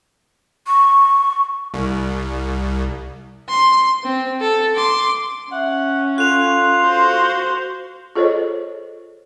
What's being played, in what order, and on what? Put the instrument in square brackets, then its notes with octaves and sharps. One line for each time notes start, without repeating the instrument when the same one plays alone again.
[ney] C#6
[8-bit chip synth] C2
[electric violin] C6
C4
A4
C6 D6
[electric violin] C#4 [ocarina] E5 [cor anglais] F#5
[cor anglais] F4 [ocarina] A4 [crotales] F#6 F7
[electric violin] F#4 C5
[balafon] F4 G#4 A4 C5 C#5 D#5